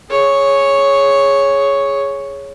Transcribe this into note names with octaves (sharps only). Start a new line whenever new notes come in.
G#4 C#5